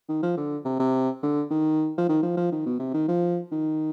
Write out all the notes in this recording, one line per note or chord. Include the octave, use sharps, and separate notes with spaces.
D#3
F3
D3
C3
C3
D3
D#3
F3
D#3
F3
F3
D#3
B2
C3
D#3
F3
D#3